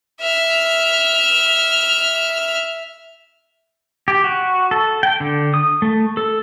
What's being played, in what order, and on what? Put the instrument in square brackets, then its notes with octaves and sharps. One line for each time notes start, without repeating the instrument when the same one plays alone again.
[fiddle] E5 F6
[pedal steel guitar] G4
F#4
A4
G5
D3
D#6
A3
A4